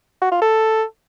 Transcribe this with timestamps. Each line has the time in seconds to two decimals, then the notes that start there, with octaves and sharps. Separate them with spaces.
0.21 F#4
0.31 F4
0.41 A4